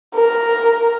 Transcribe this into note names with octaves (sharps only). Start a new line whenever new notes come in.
A#4